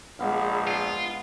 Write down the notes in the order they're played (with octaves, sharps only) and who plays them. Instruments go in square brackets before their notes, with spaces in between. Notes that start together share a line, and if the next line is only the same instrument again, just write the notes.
[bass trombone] A#1 [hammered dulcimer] G#3 B3 F5
[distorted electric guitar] F4